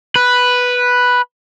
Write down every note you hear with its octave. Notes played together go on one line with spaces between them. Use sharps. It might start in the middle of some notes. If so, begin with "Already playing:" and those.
B4